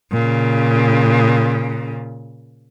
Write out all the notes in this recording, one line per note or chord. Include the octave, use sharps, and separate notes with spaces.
A#2 C#3